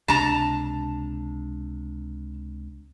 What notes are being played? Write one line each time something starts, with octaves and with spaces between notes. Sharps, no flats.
C#2 C3 D4 A5 A#5